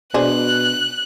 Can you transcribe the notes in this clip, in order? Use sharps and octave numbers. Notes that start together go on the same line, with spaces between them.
B2 D4 G#4 C5 F#6